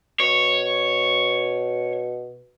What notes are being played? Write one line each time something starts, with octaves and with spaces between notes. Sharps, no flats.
B2 C#5